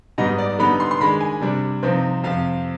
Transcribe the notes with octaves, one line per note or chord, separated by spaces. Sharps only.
G#2 G3 B3 D#4 D#5
D5
D3 G3 B3 D#4 B5
C6
C6
D#3 G#3 D4 B5
G#5
C3 G3 D4
C3 F3 C4 D#4
F2 C3 F3 F5